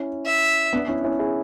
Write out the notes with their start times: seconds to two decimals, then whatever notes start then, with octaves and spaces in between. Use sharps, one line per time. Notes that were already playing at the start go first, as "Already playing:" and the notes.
Already playing: C#4 E4
0.26 E5
0.73 B3 D4
0.88 C#4 E4
1.04 C#4 E4
1.19 E4 G#4